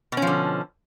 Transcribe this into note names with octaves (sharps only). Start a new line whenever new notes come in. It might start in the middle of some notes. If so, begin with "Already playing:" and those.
B2 D3 F3 C#4